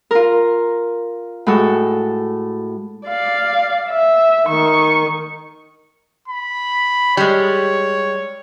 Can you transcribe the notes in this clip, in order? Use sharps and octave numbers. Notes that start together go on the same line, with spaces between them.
F4 A#4
A2 G#3 F#4 A4
D5 F5
E5
D#3 C#6
B5
G3 G#3 C#5